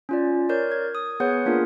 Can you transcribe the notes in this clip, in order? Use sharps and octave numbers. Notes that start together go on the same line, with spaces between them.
C#4 F4 D5
A#4 C#5 D5 G6
G#6
D#6
B3 G#4 B4 C#5 F#5 G6
A#3 D4 F4 G#4 A#4